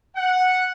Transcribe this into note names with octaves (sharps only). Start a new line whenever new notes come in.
F#5